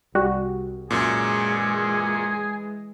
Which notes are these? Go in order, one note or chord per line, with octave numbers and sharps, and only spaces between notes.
C2 G3 F#4
F#2 A#2 E3 G#3 G#4